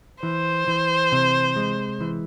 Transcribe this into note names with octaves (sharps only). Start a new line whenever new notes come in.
E3 C5
E3
C3
G#3
E3